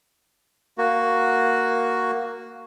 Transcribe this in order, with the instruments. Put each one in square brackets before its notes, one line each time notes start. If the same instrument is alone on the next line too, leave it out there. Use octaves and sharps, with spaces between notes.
[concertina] A#3 F#4